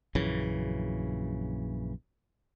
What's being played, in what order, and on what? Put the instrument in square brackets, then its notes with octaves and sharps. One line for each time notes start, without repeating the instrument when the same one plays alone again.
[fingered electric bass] A#1 F#2 C#3 E3